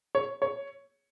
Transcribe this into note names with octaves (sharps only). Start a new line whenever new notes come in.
C#5
C#5